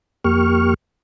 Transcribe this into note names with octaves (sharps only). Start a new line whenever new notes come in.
F2 A#3 G4 C#6 F6